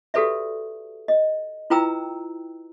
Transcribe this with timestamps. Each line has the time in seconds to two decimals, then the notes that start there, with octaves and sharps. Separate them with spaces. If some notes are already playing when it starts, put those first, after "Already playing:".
0.14 F#4 G4 A4 B4 D5 E5
1.08 D#5
1.70 E4 F4 B4 G5 A#5 E6